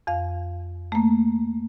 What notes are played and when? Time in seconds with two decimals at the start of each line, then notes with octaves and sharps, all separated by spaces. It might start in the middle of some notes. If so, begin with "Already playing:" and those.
0.07 F2 F5
0.92 A3 A#3